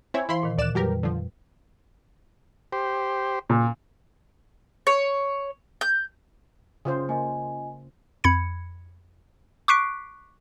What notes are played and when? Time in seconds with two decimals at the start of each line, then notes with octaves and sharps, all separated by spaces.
0.14 C4 E4 C#5 G#5 G#6
0.29 E3 E4 C5 F5 B5 C6
0.43 A#2 D#3
0.58 D2 A#2 D5 F#6 E7
0.75 F2 F#3 G3 G4 A#4 B4
1.03 D3 F3
2.73 G4 C5
3.50 A#2
4.87 C#5
5.81 G6
6.85 C#3 F4 C5 D#6
7.09 A#3 F4 D#5 G#5
8.24 F2 B5 G#6 C#7
9.68 C#6 D6 F#6 B6 C7 D7